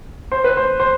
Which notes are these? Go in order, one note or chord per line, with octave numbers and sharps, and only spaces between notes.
C5
B4
C5
C5